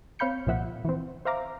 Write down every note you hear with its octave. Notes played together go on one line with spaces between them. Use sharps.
C4 C#5 F5 B5 G6 C#7
C2 A#2 F3 E5 F#5
E3 C4
C5 E5 F5 A#5 D6